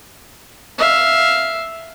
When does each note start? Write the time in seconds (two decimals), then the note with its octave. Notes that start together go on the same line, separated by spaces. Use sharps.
0.78 E5 F5